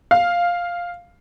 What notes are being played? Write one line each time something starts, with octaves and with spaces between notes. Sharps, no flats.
F5